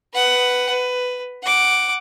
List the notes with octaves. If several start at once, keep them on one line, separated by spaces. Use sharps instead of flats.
B4 F#5
B4
F#5 D6